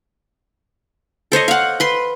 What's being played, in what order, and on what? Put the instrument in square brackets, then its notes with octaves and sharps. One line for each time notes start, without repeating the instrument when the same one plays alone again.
[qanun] A4 C5 C#5 D#5
F5 F#5
B4 C6